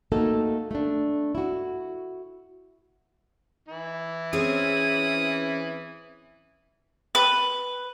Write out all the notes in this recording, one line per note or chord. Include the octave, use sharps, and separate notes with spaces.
A3 A#3 D#4 F#4 A4
A3 D4
E4 F#4
E3 E4
C4 C#4 G#4 D#6
B4